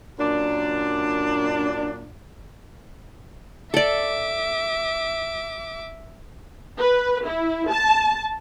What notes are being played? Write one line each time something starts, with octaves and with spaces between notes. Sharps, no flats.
F#2 A#2 D4
A4 D5 E5 D6
B4
E4
A5